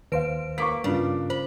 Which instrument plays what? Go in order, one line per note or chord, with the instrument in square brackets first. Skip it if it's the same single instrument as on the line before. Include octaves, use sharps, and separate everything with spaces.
[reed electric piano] D#2 C5 F5 [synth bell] B4 D7
[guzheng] A#3 [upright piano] C#6 D6 B6
[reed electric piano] G2 [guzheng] C#3 [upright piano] D4 F4
[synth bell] C5 [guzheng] B5